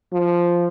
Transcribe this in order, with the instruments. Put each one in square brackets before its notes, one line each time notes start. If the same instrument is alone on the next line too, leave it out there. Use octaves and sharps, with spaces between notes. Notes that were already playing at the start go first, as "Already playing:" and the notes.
[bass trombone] F3